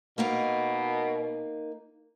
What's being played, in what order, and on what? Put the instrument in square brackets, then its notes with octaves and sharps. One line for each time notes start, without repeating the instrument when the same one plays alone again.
[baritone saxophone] B2 [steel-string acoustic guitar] A#3 D#4 A#4